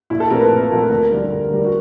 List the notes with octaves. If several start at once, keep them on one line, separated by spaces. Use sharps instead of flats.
A#1 E4
A4
A#2 F3 A3 C4 A#4
B4
A#1
A#2 F3 A3 C4
D2 A#4
D3 G3
D2
D3 G3
F#4